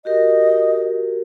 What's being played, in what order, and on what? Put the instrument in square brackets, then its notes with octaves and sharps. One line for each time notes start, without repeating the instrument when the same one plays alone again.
[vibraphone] F#4 G4 A#4 [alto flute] D#5